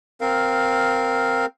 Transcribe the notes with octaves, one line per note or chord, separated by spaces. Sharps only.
C4 A#4 F5